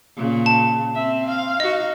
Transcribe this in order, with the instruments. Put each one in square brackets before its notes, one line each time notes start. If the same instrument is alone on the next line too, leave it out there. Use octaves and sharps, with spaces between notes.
[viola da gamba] A#2 C#3
[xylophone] A5
[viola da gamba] C4 [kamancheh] E5
[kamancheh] F5
[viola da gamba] D#4 F#4 [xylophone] D#5